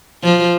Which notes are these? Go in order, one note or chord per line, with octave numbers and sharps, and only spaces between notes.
F3